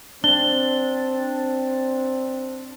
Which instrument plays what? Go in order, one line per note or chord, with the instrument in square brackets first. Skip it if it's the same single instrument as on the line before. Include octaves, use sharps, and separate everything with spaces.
[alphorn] C4 [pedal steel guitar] D4 [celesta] G7